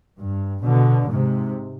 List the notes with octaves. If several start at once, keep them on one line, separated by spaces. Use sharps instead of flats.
G2
B2 D3
G#2 C3